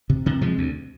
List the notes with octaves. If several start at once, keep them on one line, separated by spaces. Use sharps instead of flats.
C3
C3
C3 F3 G#3
D2